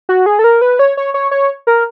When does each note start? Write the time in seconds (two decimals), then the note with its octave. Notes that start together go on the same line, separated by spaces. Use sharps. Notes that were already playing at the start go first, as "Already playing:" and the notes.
0.09 F#4
0.26 G#4
0.39 A4
0.44 A#4
0.61 B4
0.79 C#5
0.97 C#5
1.14 C#5
1.31 C#5
1.67 A#4